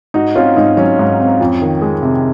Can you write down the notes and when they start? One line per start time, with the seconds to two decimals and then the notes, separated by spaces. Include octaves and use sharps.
0.14 G#2 D#4 F#4
0.35 C4 C#4 F4
0.56 G#2 D#4
0.77 F#3 C#4
0.99 G#2
1.20 C4
1.41 F2
1.62 D#3
1.82 G#3
2.02 C3